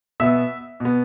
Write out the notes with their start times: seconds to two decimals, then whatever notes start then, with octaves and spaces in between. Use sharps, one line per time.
0.20 B2 B3 E5
0.80 B2 B3